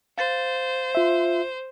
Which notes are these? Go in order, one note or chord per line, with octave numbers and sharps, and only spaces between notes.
C5 F5 A6
F4 E5